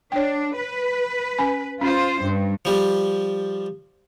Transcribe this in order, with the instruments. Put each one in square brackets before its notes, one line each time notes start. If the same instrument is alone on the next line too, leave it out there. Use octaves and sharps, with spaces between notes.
[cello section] D4 [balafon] C#5 G5
[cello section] B4
[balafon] C#4 G#5 B5
[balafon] C#4 [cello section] F4 C5
[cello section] G2
[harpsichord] F3 G3